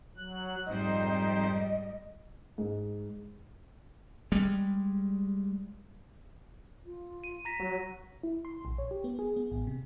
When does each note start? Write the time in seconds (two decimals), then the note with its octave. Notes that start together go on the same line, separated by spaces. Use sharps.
0.17 F#3 F#6
0.66 F2 G#2 G3 D#4 C5 D#5
2.58 G#2
4.32 G3 G#3
6.85 F4
7.24 D#7
7.45 A#5 A#6 B6
7.60 F#3
8.23 E4
8.45 C6
8.65 A#1
8.78 C#5
8.91 G4
9.04 B3
9.19 G#4
9.36 B3
9.51 A1
9.67 C3